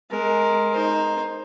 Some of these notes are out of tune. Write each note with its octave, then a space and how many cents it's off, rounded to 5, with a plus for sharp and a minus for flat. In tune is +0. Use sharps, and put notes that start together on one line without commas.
G#3 +20 A#4 +0
D#4 +0 C5 +15